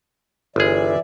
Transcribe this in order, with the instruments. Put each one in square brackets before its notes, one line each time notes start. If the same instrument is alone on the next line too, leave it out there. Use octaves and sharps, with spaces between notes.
[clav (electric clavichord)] G1 G#4 [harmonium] E3 D5 E5